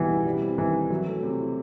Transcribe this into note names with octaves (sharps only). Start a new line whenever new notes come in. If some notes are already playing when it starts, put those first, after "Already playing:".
Already playing: B2 E3 G3 B3 D#4
E4
G3
C4
D#3 E3
E4
E3 F#3
A3
C3
E4